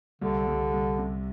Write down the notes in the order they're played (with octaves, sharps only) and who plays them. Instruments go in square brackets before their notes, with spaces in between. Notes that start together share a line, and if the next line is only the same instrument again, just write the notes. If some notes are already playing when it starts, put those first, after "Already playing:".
[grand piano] C2 [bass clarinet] D3
[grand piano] C2
C2
C3